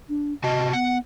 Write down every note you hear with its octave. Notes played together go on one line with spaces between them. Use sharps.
D4
C3 F#4 D#5 A5
B3 F#5